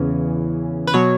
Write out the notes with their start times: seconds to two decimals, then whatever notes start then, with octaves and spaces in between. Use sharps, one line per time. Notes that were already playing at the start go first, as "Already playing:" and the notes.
Already playing: E2 C#3 E3 C#4
0.87 B4
0.94 B2 F#3 C#5